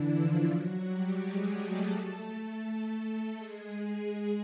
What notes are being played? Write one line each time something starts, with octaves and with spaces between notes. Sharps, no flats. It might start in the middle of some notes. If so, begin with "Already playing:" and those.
Already playing: D3 E3 D4 E4
F3 F4
F#3 F#4
G3 G4
G#3 G#4
A3 A4
G#3 G#4